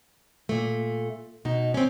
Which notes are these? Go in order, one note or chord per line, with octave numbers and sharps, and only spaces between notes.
A#2 A3
B2 D#4
C4 C#4